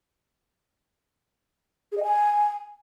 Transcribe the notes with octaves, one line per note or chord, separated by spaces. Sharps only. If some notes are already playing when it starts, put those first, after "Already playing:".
G#4
D#5
G#5